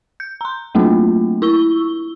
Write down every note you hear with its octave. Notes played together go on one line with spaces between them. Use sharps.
G6
A#5 C6
F#3 A3 A#3 C4 D4 F4
E4 C#6 E6 G7